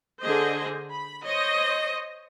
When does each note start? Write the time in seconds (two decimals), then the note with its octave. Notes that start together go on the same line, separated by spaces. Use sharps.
0.23 D3 G#4 C5 D#5
0.91 B5
1.24 C5 C#5 D#5